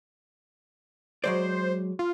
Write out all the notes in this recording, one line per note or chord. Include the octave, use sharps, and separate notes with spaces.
F#3 G#3 C5 D5
F4